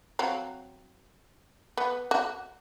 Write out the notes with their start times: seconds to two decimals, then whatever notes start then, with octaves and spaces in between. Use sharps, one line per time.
0.19 F#3 C4 F5
1.77 B3
2.11 F#4